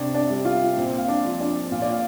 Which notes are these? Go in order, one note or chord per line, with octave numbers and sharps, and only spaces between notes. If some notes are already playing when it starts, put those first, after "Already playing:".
Already playing: C3 D4 D5
D4 D5
G3
F4 F5
A#2 C4 C5
F5
D4 D5
F3
D4 D5
A#2 F5
D5
F5